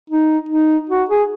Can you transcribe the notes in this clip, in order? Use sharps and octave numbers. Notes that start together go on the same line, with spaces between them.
D#4
D#4
F#4
G#4